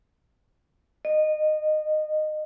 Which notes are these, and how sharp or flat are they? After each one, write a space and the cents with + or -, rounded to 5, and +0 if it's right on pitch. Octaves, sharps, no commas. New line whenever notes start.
D#5 -20